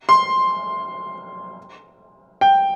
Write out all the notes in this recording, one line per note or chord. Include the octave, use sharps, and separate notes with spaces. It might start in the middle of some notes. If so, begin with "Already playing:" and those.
C6
G5